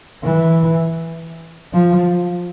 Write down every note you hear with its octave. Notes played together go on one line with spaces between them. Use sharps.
E3
F3